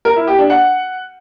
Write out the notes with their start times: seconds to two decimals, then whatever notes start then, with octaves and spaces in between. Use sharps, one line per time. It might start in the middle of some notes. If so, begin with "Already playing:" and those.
0.05 A#4
0.16 E4
0.27 G4
0.39 D4
0.50 F#5